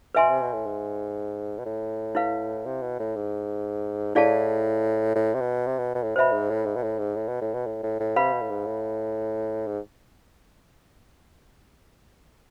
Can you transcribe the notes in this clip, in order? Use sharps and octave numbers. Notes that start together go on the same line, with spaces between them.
B2 B4 E5 G#5 C6
C3
B2
A2
G#2
B2
A2
E4 B4 F5
C3
B2
A2
G#2
A2 E4 G#4 D5 F5 A5
A2
C3
B2
C3
B2
B2
A2
B2 C5 E5 B5
G#2
A2
G#2
B2
A2
G#2
A2
B2
A2
B2
A2
A2
A2
C3 B4 F5 B5
B2
A2
G#2
A2
G#2